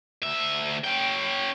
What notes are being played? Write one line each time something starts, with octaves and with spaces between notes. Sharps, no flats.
D2 E5
C#4 G5